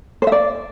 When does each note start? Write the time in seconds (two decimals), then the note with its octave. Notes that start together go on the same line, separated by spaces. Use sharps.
0.22 C5
0.27 E5
0.32 D5